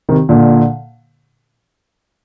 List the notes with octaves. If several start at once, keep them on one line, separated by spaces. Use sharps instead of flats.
C3 D#3
A#2 D3